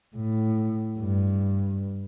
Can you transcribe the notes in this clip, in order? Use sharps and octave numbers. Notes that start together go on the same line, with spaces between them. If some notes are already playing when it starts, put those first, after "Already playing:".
A2
G2